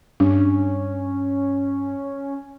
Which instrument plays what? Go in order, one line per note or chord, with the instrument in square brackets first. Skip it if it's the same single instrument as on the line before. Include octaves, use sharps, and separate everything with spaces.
[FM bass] G2 [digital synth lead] C#4 [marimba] D4